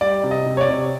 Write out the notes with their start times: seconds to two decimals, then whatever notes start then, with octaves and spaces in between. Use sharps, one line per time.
0.01 G3 D5
0.24 C3
0.31 D#5
0.46 C3
0.57 C#5
0.61 D5
0.68 C3